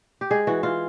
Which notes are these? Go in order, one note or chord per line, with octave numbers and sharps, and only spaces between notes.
G4
G#3 G#4
E3 F#4
E3 F4